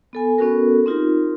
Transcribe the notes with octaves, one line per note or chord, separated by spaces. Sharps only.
B3 A4 G#5
B3 C#4 F#4 A4 A#4
C4 D#4 F4 G4 A#4